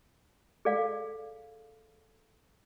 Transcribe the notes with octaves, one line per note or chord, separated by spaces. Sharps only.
G#4 A4 D5 F5